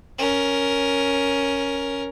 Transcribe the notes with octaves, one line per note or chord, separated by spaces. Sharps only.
C#4 A#4